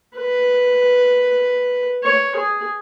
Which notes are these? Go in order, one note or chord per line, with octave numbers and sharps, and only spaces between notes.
B4
C#5
G#4